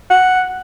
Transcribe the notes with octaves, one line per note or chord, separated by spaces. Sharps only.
F#5